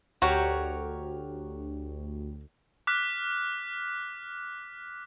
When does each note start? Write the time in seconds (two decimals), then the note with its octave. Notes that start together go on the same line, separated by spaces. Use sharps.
0.22 D2 F#4 G4 A#4 C#5
2.87 D6 F6 F#6 B6